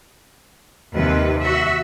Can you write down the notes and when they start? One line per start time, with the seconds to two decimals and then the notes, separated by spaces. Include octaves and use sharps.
0.93 D#2 C3 B4
1.41 F#4 E5